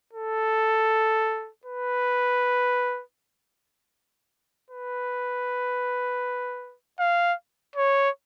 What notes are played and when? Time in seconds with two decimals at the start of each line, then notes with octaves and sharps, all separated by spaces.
0.13 A4
1.65 B4
4.70 B4
6.99 F5
7.75 C#5